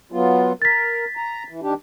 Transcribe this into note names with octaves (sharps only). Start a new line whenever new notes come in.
F#3 B3 F4
A#4 A6 B6
A#5
E3
D#3 D4 G4